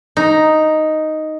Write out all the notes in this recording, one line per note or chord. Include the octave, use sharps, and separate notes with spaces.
D#4